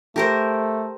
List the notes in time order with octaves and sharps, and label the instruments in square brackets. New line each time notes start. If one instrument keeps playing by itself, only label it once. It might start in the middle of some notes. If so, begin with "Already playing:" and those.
[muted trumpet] A3 [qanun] G4 A#4 C5